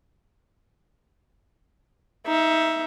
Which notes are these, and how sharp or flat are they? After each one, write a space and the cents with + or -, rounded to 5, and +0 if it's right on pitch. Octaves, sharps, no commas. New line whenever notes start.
D#4 +25 E5 +5